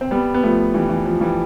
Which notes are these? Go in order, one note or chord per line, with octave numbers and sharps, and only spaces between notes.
C4
G3 B3
B3
F3 A3
E3 G3
E3
F3
E3 G3